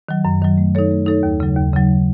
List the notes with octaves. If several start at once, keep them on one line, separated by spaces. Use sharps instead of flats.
D#3 F#3
F#2
D#3 F#3
A3
D#4 A4 C#5
A3
D#4 A4 C#5
D#2
C#3 F#3
D#2
C#3 F#3